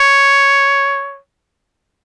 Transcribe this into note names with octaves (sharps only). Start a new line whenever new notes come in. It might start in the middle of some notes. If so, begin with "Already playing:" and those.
Already playing: C#5